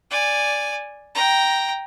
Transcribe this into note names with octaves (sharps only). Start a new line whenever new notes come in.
D5 G#5
G5 A#5